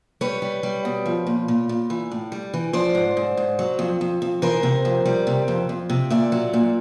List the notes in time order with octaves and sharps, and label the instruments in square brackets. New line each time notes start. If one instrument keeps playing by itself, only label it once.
[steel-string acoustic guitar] G3 B4 C#5
G3
G3
B2
F3
A#2
A#2
A#2
E3
A2
G3
E3
F3 C5 D5
G#2
G#2
G#2
F#3
F2
F2
F2
E3 A#4 C5
C3
F2
G3
C3
F2
F2
C3
A#2 D5 E5
F#3
A#2